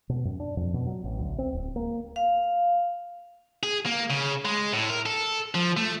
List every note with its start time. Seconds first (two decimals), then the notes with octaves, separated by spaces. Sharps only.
0.09 B2
0.25 F#2
0.40 D4
0.57 F2
0.74 B2
0.86 F#3
1.04 A1
1.20 D2
1.38 C4
1.53 D1
1.76 A#3
2.16 F5
3.63 G#4
3.86 A#3
4.10 C#3
4.45 G#3
4.73 A2
4.89 A#4
5.06 A4
5.55 F3
5.77 A3